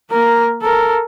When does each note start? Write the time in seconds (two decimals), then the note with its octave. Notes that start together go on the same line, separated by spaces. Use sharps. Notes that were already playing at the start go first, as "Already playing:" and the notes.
0.11 A#3 A#4
0.62 A4 A#4